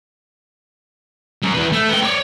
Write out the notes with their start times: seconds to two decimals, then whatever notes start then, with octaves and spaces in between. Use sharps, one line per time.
1.43 F#2
1.55 E2 B4
1.72 A3
1.89 B3 G5
2.03 C#5 D5